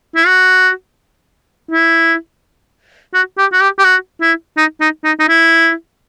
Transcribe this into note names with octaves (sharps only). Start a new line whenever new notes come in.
E4
F#4
E4
F#4
G4
F#4
G4
G4
F#4
E4
D#4
D#4
D#4
D#4
E4